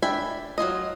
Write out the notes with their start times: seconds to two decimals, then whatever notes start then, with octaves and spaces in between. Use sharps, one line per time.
0.02 D4 E5 G5 G#5 B5
0.58 F#3 D4 F4 D#5